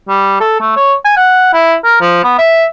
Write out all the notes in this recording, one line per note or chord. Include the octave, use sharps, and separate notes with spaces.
G3
A4
A3
C#5
G#5
F#5
E4
A#4
F3
B3
E5